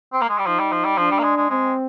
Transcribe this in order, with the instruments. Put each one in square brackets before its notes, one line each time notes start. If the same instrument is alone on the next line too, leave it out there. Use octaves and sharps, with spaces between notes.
[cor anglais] C4
A#3
G#3
G3
[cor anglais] F3 [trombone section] D#4
[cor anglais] G3
F3
G3
[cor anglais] F3 [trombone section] D4
[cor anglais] G3
A#3
G#3
G#3
[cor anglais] G#3 [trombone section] C4